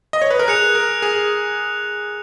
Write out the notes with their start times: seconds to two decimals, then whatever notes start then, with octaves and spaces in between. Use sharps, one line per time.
0.13 D#5
0.22 C#5
0.31 B4
0.39 A#4
0.48 G#4 F#6 C#7 F7
0.75 A#4
1.02 G#4